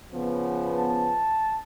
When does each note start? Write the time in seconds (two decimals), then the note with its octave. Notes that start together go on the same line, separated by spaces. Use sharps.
0.13 C#3 F3 B3
0.78 A5